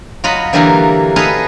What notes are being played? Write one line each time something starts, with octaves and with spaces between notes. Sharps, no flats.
F#3 F4 D#5 F#5 B5
D3 E3 F#3 G3 A#3 A#4
G#4 A4 B4 C#5 D#5 F5